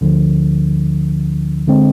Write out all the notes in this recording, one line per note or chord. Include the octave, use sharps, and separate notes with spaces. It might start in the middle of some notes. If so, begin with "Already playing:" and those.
D2 D3 F3
D3 G#3 C4